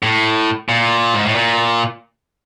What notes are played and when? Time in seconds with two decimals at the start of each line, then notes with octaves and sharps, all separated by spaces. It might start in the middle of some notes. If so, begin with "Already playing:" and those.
0.03 A2
0.69 A#2
1.14 G#2
1.25 A2
1.35 A#2